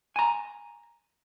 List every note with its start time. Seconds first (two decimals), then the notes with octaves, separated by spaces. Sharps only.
0.16 G#5 A#5